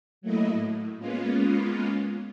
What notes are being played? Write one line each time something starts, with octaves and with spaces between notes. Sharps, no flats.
F#3 A3 A#3 E4 D#5
A2
G#3 A#3 B3 C#4 F4